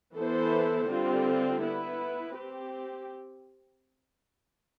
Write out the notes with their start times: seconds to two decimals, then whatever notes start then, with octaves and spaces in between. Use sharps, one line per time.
0.15 E3 B3 E4 A4 C5
0.88 D3 G3 C4 F4
1.62 B3 E4 B4
2.35 C4 G4